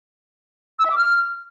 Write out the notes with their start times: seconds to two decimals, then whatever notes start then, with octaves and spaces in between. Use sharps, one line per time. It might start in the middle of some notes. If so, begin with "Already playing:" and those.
0.79 E6
0.85 E5
0.91 D6
0.97 F6